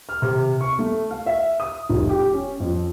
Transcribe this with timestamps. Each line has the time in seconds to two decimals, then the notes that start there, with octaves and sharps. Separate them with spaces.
0.09 F6
0.22 C3
0.61 C#6
0.79 A3
1.10 F5
1.26 E5
1.60 D#6
1.90 F1
2.09 G4
2.34 C#4
2.60 F2